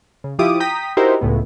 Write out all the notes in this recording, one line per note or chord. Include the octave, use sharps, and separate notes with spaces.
C#3
F3 E4 F4 G4 D6 D#6
G5 A#5 D#6 B6
D#4 E4 F#4 G4 A#4 C5
C#2 A2 B3